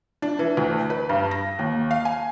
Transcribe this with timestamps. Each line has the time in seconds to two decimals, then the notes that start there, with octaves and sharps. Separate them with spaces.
0.22 D4
0.39 E3
0.57 D2
0.90 B4
1.09 G2
1.31 A#6
1.59 D#2
1.91 F5
2.05 G#5